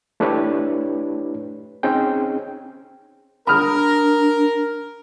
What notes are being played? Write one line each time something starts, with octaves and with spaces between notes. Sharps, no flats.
A3 D4 E4 G4 B4 C#5
C4 C#4 D#4 G#4 G5
D4 A#4 B5 D#6 F6